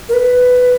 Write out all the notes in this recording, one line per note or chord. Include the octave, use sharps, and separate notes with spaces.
A#4
B4